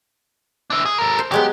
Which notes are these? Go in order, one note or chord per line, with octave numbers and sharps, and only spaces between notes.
D4 E4
G#4
A4 A#4
C5
F#3 G#3 B3 G4